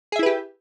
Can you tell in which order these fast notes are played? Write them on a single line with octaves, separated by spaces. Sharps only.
G#4 E5 E4 B4 G4